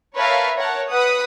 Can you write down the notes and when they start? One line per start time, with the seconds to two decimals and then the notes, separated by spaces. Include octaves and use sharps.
0.17 A#4 B4 C#5 E5 F5 A5
0.57 A#4 C#5 F#5 A5
0.89 B4 F#5 B5 D#6